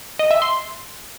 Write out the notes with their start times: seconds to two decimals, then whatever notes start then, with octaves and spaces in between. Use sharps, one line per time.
0.19 D#5
0.31 E5
0.42 C6